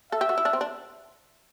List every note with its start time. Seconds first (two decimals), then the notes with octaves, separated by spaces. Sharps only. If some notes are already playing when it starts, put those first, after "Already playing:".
0.12 A4 E5
0.21 G4
0.29 F#4
0.38 E4
0.45 D4
0.53 C4
0.61 D4